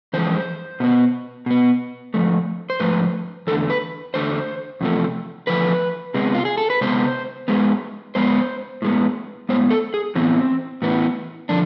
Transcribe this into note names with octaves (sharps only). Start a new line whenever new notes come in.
F2 E3 G#3 C5
B2 B3
B2 B3
G#2 F3 A3
C5
G#2 F3 A3 B4
E2 D3 A3 A4
B4
E2 D3 A3 C5
E2 C3 F3 A3
E2 C3 F3 A3 B4
C3 G#3 B3
F4
G#4
A4
B4
C3 G#3 B3 C5
G#2 G#3 B3
G#2 G#3 B3 C5
A2 G#3 B3
A2 G#3 B3 C5
A4
G#4
A2 E3 B3 C4
A2 E3 B3
D3 F3 D4